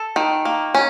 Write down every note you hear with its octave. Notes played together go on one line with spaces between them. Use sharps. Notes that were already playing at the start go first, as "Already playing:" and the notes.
Already playing: A4
D#3
A#3
C#4